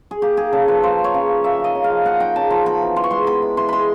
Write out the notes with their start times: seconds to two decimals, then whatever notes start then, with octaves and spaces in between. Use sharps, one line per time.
0.11 G#4
0.22 A#3 G4
0.37 D#4 G#4
0.52 C#3 A4
0.68 F3 B4
0.83 A#3 C5
0.98 D#4
1.04 C#5
1.14 C#3
1.29 F3
1.44 A#3 E5
1.59 D#4 D#5
1.75 C#3
1.84 F5
1.90 F3
2.05 A#3 F#5
2.20 D#4 G5
2.36 C#3 A5
2.50 F3 A#5
2.66 B3 B5
2.82 E3
2.96 E3 C6
3.04 C#6
3.11 G#3 C6
3.27 B3 B5
3.42 E3
3.57 E3 C6
3.69 G#3 B5 C6